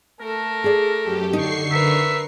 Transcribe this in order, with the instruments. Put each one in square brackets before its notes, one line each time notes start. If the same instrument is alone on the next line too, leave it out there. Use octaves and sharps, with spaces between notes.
[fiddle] A3 A4 [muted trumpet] A#4
[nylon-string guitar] G#4 D5
[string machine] F#2 G4
[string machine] D3 C#6 C7 [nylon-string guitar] D#4
[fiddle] A#4 B4 [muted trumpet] E5